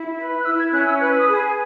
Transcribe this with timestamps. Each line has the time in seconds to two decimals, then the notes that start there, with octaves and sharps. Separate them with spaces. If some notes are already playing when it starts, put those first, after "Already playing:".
Already playing: E4
0.17 B4
0.40 F#6
0.45 E4 E6
0.59 G#6
0.72 C#4 F#6
0.86 E6
1.00 B4 F#6
1.19 D#6
1.27 G#4